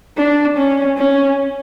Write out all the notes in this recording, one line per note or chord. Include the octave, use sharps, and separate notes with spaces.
D4
C#4
C#4